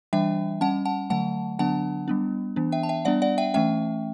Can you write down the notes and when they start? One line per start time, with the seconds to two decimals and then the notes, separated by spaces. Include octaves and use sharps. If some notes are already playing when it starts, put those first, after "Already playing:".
0.13 E3 G3 D4 E5 G5
0.61 G3 C#4 F#5 A5
0.85 F#5 A5
1.10 D3 F#3 A3 F#5 A5
1.59 D3 F#3 B3 D4 F#5 A5
2.08 G3 B3 D4
2.56 E3 B3 D4
2.72 E5 G5
2.83 A5
2.89 E5 G5
3.05 G3 B3 D4 D5 F#5
3.22 D5 F#5
3.38 E5 G5
3.54 E3 A3 C#4 E5 G5